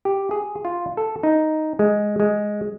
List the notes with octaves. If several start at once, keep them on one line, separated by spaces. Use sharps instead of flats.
G4
G#4
F4
A4
D#4
G#3
G#3